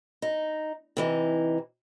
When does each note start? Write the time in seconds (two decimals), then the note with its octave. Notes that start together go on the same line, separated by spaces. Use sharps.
0.22 D#4
0.97 C3 E3 D#4